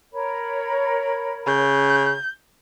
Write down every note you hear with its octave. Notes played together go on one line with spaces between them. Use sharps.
A#4 C#5 B5
C#3 G6